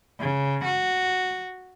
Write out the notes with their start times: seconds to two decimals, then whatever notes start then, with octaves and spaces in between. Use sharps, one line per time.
0.20 C#3
0.65 F#4